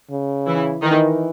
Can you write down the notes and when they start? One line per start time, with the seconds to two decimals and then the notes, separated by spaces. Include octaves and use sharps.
0.11 C#3
0.47 E3 E4
0.82 D#3 E3 D#4